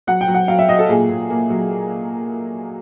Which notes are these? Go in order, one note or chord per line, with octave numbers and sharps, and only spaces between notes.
F#3 F#5
G5
F#3
F#5
F#3 F5
E5
F#3 D#5
A4
A#2 G#4
A#2
A#3
F#3